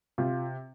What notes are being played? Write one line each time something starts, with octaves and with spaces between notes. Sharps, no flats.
C3 F4